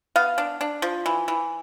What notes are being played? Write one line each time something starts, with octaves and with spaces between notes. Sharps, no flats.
B3 F5
D4
D4
F3
E3
E3